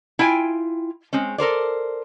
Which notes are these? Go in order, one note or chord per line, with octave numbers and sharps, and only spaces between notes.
E4 F4 G5 G#5
G#3 C4 C#4
A4 A#4 C5 D5